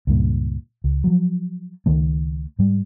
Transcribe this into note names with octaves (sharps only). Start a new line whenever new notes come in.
C#2 G2 A#2
C#2
F3 F#3
C#2 D#3 A3
G#2 G3